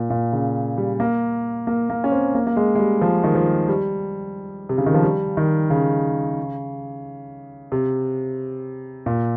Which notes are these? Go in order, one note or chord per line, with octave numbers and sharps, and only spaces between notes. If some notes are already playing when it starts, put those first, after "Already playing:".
Already playing: A#2
A#2
C#3
G3
A#3
A#3
A#3
C#4
C4
A#3
A#3
G#3
G#3
G3
F3
D#3
F3
G3
C3
C#3
D#3
F3
G3
D#3
C#3
C3
A#2